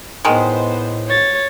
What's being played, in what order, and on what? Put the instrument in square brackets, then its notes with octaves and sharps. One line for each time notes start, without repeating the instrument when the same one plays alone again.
[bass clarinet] A2 [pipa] D#3 G#3 [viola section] B3 C5
[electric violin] C#5 A6